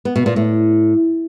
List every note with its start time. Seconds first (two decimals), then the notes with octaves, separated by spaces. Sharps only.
0.05 B3
0.16 B2
0.26 A#2
0.36 A2